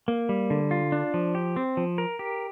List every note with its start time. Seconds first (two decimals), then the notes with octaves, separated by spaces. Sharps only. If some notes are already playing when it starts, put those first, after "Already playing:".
0.08 A#3
0.29 G3
0.50 D3
0.71 F4
0.92 D4
1.14 F3
1.35 G4
1.56 C4
1.77 F3
1.98 A#4
2.19 G4